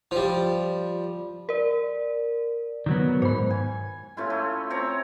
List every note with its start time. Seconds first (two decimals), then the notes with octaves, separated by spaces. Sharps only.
0.11 F3 G3
1.49 A#4 D5
2.86 D#3 F#3 B3
3.22 G#2 C5 B5
3.50 G#5
4.17 A3 C#4 E4 F4
4.30 A3
4.70 C4 C#5 A#5